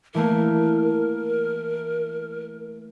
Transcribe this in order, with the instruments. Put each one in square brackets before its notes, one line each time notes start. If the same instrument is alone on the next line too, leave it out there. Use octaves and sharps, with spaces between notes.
[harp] E3 A3 A#3 [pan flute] A#4